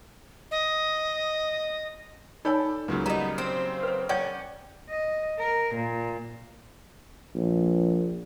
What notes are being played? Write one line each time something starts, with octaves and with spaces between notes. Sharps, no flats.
D#5
D#4 A4 C#5 D5 G#5 B5 E6 G6
C#2 C#3 F#3 A#3
G3 B3 D#4 A#5
C4
B4 C5
C#4 D5 F#5 G5 G6
D#5
A#4
A#2
A#1